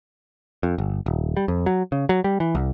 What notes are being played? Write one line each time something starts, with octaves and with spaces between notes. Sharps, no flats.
F2
G1
D#1
G3
F2
F#3
C#3
F#3
G3
E3
C2